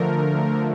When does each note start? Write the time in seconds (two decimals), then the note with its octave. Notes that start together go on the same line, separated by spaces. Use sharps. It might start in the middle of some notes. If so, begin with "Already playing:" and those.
Already playing: D3 F3 A3 A#4